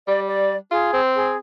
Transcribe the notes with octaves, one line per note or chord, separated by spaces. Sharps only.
G3 D5
D5
F4 G#4
C4
G#4